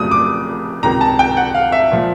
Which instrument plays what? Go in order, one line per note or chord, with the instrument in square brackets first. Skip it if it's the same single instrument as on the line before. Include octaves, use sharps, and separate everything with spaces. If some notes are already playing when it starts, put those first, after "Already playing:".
Already playing: [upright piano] F1 F2 C#3 F#3 A3 D#6
D6
C#2 C3 D#3 A#5
A5
G5
F#5
F5
E5
A#2 F3 G#3